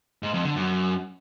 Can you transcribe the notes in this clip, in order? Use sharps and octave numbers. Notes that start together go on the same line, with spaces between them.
G#2
F2
D3
F#2